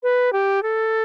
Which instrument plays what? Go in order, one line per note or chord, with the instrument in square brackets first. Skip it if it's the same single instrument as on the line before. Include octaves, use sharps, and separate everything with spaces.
[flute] B4
G4
A4